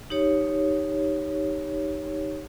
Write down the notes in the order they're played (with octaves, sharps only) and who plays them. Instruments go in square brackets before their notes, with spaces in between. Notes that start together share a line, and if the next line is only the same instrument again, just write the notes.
[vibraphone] D#4 G4 C#5